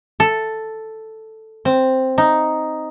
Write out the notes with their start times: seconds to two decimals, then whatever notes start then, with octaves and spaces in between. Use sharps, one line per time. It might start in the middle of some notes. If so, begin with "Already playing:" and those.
0.20 A4
1.65 C4
2.18 D#4